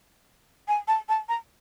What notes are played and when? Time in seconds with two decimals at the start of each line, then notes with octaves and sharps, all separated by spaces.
0.68 G#5
0.88 A5
1.09 A5
1.29 A#5